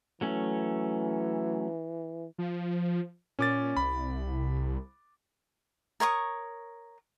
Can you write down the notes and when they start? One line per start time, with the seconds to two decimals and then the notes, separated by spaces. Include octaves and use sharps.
0.21 E3 F#3 A3 C#4
2.38 F3
3.39 A#2 C#4 D6 A6
3.77 C2 B5
6.00 A#4 C#5 C#6 D#6